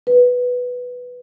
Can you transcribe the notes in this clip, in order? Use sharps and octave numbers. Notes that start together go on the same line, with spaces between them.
B4